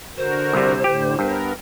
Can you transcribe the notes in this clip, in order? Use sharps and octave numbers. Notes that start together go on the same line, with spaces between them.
D3 F#4 A#4 C5
C2 C3
A2 D3 G4
G2 B3 A#4